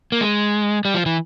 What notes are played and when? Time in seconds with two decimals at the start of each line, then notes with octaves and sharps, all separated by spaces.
0.12 A#3
0.21 G#3
0.85 G3
0.94 F3
1.06 E3